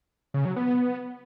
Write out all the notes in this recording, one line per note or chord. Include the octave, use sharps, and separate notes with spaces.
C#3
F#3
B3